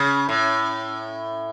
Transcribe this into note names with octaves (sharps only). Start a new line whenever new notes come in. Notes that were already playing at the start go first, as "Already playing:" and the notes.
Already playing: C#3
A2